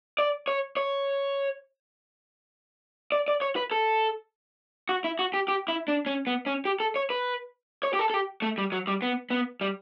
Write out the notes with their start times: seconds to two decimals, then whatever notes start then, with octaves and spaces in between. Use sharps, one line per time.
0.19 D5
0.48 C#5
0.77 C#5
3.12 D5
3.28 D5
3.42 C#5
3.56 B4
3.71 A4
4.89 F#4
5.04 E4
5.19 F#4
5.34 G4
5.48 G4
5.68 E4
5.88 D4
6.06 C#4
6.27 B3
6.46 C#4
6.65 G4
6.80 A4
6.96 C#5
7.10 B4
7.83 C#5
7.93 G4
7.99 A4
8.10 A4
8.14 G4
8.42 A3
8.58 G3
8.72 F#3
8.87 G3
9.02 B3
9.30 B3
9.61 G3